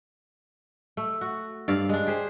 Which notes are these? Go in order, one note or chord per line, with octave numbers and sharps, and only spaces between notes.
A3
F#4
G2 D5 F5
G#3 D4
G4 G#4 C5